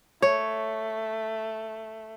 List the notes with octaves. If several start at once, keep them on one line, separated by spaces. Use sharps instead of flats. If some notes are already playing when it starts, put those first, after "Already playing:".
A3 C#5